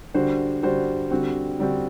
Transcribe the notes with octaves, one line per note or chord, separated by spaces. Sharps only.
D3 G3 D4 F#4 C5
D3 G3 D4 F#4 C5
D3 G3 C4 F#4
D3 G3 C4 F#4